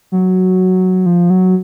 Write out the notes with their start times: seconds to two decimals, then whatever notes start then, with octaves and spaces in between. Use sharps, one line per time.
0.12 F#3
1.06 F3
1.30 F#3